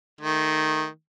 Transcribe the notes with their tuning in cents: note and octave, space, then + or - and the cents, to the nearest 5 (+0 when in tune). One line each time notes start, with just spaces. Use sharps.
D#3 +0 A3 -5